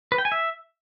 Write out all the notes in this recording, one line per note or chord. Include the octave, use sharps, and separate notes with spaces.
B4
G5
G#5
E5